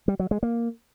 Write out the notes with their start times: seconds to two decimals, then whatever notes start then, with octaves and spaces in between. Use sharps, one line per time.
0.08 G3
0.19 F#3
0.31 G#3
0.43 A#3